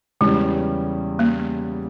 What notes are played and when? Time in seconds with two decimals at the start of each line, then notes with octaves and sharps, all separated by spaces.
0.21 E2 C#3 E3 G3 G#3 C#4
1.19 A#3